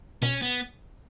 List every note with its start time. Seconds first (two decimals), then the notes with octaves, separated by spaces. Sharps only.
0.22 B2 C#4
0.42 B3